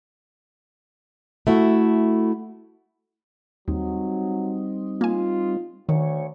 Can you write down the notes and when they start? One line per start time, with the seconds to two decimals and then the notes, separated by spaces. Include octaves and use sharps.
1.47 A3 E4 F#4
3.68 D#2 F#3 G3 C4 D#4
5.01 A#3 F4 G#5
5.89 D2 D#3 C#5